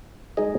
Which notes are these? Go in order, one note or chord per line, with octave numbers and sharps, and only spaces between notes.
G#3 D#4 G#4 D#5